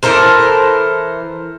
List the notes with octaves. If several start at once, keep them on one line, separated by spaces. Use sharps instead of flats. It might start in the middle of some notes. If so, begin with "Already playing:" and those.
E3 A4 A#4 C5